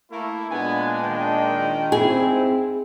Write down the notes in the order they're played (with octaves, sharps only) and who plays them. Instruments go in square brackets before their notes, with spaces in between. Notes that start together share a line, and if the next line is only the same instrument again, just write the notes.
[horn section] A3 A#3 E4
[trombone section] A#2 G#3 D4 [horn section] B3 G#5
[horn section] D#3 G5
[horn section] G#2 D#4 E4 [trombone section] C4 [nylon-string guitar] G#4